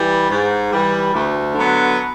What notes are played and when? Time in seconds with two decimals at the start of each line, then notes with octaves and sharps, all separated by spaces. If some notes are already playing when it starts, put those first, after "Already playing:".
Already playing: E3 G3
0.29 G#2
0.71 E3 G3
1.13 D2
1.55 D3 F#3 B3